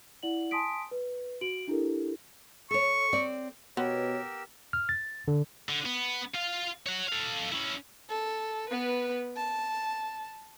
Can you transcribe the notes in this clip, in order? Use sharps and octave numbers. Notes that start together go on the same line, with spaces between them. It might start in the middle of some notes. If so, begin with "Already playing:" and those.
E4 D5 F#5 F#7
G#5 A5 C6 D#6 B6 D7
B4
F#4 D7 F#7
D4 E4 G4 A4 A#4
A4 C#5 C#6
C4 D5
B2 B3 G4 A#4 C#5 E6
F6
A6
D3
D3
B3
F4 F5
C#5 F#5
A4 F5
C#4 E4
A4
B3 B4
A5